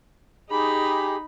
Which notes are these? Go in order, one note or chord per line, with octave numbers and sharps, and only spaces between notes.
D#4 G4 G#4 B5